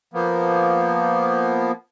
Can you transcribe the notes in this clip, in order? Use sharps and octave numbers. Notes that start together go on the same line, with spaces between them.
F3 A#3 B3